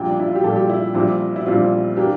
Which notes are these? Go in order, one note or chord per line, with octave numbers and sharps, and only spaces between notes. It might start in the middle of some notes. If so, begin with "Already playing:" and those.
Already playing: A#1 A#2 G3 G5
D4
E4
F4
G4
A#1 A#2 G3 A4
G4
E4
A#1 A#2 G3 C4 E4
E4
A#1 A#2 G3 C4 F4
E3 A#3 D4 G4